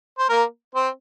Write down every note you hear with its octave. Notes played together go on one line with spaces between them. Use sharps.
C5
A#3 A#4
C4 C5